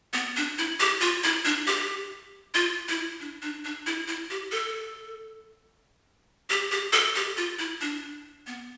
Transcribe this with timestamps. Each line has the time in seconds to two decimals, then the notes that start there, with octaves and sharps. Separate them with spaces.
0.13 B3
0.36 D4
0.58 E4
0.80 G4
1.01 F4
1.23 E4
1.45 D4
1.67 G4
2.54 F4
2.88 E4
3.20 D4
3.42 D4
3.65 D4
3.86 E4
4.08 E4
4.30 G4
4.52 A4
6.50 G4
6.71 G4
6.93 A4
7.15 G4
7.37 F4
7.59 E4
7.81 D4
8.47 B3